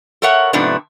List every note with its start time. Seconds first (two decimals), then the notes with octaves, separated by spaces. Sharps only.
0.22 A4 A#4 C#5 E5 F#5
0.53 G#2 C3 F3 A3 B3 D4